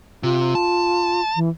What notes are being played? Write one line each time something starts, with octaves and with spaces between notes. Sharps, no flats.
C3 F4
A5
E3